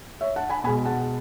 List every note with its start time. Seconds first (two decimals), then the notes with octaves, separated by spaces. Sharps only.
0.21 C#5 E5
0.36 F#5 A5
0.50 G#5 B5
0.64 B2 G#3 G#5 B5
0.85 F#5 A5